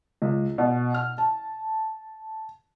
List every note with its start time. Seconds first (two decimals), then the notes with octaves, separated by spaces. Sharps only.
0.22 C#2
0.58 B2
0.94 F6
1.18 A5